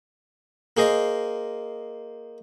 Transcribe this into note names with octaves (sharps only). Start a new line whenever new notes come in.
A#3 G#4 C5 D#5